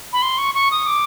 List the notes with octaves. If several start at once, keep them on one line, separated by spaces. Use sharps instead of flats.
B5
C6
C#6
C#6
D#6
D6